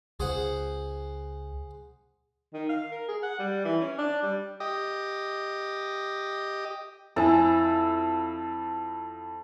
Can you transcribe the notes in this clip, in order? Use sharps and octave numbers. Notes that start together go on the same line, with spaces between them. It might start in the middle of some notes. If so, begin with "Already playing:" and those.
C#2 G#4 C5 F#5
D#3
F5
A#4
G#4
F#5
G3
E3
C#4
D4
G3
G4 D#5
F2 E4 A4 G#5 A5